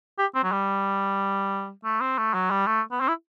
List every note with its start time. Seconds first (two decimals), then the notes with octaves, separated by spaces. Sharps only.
0.18 G4
0.35 C4
0.44 F#3
0.52 G3
1.84 A3
2.01 C4
2.18 A3
2.34 F#3
2.50 G3
2.66 A3
2.92 B3
3.00 C4
3.08 E4